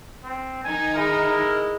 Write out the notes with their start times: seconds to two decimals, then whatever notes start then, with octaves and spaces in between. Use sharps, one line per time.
0.23 C4
0.64 D#3 D#4 G#5
0.95 G#3 E4 A#4